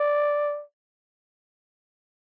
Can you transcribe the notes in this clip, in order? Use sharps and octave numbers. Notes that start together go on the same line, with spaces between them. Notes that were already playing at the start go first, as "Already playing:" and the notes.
Already playing: D5